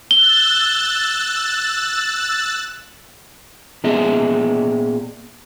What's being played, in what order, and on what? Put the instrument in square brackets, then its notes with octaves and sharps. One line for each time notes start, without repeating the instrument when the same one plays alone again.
[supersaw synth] E6 F#6 A6 [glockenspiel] G7
[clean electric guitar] A#2 B3 G#4 D#5 E5